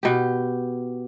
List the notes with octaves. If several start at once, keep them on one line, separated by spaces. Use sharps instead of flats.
B2 G4